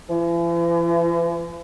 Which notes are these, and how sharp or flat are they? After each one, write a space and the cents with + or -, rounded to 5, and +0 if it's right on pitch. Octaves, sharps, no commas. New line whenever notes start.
E3 +45